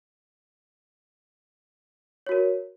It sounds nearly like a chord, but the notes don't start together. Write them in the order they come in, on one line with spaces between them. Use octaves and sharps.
C#5 F#4 A#4